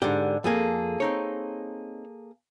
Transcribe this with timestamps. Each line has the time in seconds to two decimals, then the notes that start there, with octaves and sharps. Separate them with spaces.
0.02 G#2 D3 G4
0.44 F2 A#3 G#4 A4 G#5
1.00 C4 D#4 C#5